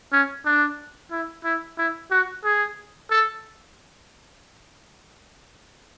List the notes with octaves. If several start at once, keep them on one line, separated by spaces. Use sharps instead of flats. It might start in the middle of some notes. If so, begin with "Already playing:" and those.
C#4
D4
E4
E4
E4
F#4
G#4
A4